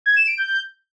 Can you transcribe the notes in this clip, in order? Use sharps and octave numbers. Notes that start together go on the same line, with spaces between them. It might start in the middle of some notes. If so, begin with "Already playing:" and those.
G#6
E7
D7
G6